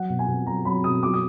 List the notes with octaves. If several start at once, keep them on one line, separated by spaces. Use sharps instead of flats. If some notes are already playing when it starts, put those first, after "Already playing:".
Already playing: F#3 F#5
B2
G#5
B2
F#3 A#5
F#3 B5
B2 D#6
F#3 D6
D#6